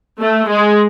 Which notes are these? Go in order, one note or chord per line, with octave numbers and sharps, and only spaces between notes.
A3
G#3